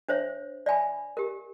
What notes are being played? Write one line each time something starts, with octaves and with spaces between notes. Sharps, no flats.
D4 C5 C#5 E5
D5 E5 G#5 B5
G4 A#4